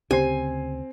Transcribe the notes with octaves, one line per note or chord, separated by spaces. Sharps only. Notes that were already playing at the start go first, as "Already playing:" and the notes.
D2 C#3 C4 G4 C5 G#5 C7